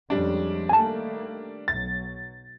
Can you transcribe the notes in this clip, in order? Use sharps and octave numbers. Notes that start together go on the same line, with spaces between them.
F2 G3 G#3 C#4 D4
D#3 A3 A#3 G#5 A5
B1 F#3 A6